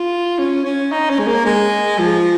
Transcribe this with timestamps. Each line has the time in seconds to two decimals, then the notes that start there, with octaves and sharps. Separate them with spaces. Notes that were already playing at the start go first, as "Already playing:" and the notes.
Already playing: F4
0.39 C#4
0.65 C#4
0.92 D#4
1.10 C#4
1.19 G#3
1.27 A#3
1.45 G#3
1.99 F3